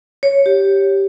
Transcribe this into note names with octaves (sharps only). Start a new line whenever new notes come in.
C#5
G4